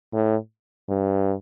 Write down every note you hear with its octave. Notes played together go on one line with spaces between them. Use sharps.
A2
G2